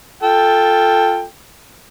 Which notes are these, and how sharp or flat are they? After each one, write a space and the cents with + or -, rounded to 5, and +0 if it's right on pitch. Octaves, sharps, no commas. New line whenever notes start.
F4 +0 A4 +0 G5 +10